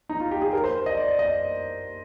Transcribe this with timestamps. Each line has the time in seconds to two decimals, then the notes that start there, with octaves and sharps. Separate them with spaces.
0.09 D#4
0.20 F4
0.31 G4
0.42 G#4
0.53 A#4
0.64 C5
0.86 D#5
0.97 D5
1.19 D#5